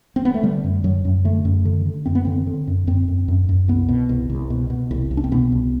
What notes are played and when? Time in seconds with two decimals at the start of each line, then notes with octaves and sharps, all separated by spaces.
0.16 C4
0.25 B3
0.34 A3
0.43 D3 G3
0.64 F#2
0.84 F#2 F#3
1.05 F#2
1.25 D3 A3
1.45 F#2
1.65 D3
1.86 D3
2.06 F#2 C4
2.15 B3
2.25 D3 C4
2.47 D3
2.67 F#2
2.87 F#2 C4
3.08 F#2
3.28 F#2
3.49 F#2
3.68 C2 B3
3.89 B2
4.09 C2
4.30 C2
4.50 B2
4.70 B2
4.91 C2
5.11 C2
5.17 D4
5.24 C4
5.32 B2 B3
5.52 C2